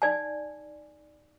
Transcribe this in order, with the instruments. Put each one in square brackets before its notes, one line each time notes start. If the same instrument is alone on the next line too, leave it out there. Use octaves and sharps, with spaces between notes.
[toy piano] D#4 D5 G#5